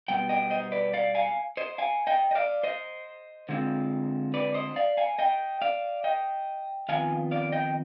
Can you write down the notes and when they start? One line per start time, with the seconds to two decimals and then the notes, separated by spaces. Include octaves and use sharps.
0.08 B2 G3 B3 G5
0.29 D#5 G5
0.50 C5 D#5
0.72 B4 D5
0.93 D5 F5
1.15 F5 G#5
1.57 C5 D#5
1.78 F5 G#5
2.07 D#5 G5
2.31 D#5
2.35 D5 F5
2.63 C5 D#5
3.49 D3 G#3 C4 F4
4.34 B4 D5
4.54 C5 D#5
4.76 D5 F5
4.97 F5 G#5
5.19 D#5 G5
5.62 D5 F5
6.04 D#5 G5
6.89 F2 D#3 B3 F4 F5 G#5
7.31 D5 F5
7.52 D#5 G5